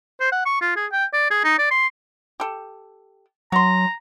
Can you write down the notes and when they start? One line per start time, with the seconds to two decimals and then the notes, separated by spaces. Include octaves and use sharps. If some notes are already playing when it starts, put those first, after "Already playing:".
0.20 C5
0.32 F#5
0.46 C#6
0.61 F4
0.76 G#4
0.92 G5
1.13 D5
1.30 G#4
1.44 D#4
1.59 D5
1.71 C6
2.40 G4 A4
3.52 F#3 F#4 A#5 C6